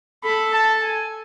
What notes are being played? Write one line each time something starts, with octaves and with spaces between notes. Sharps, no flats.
A4 B5
A5
G#5